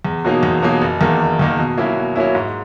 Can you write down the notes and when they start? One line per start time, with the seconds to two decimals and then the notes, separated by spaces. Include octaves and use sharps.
0.05 E2
0.25 B2 F#3 A#3 D#4
0.43 E2
0.63 B2 F#3 A#3 D#4
0.82 F#1
1.01 E2 D#3 A#3
1.20 F#1
1.39 E2 D#3 A#3
1.58 B2
1.78 F#3 A#3 C#4 E4
1.96 B2
2.16 F#3 A#3 C#4 E4
2.35 G#2